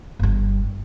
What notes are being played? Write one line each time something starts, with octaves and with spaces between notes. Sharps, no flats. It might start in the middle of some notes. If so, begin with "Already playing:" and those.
G1 G2